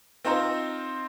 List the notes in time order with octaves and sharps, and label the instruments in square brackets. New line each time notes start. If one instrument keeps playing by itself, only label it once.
[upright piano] C4 D#4 F4 C5 A#5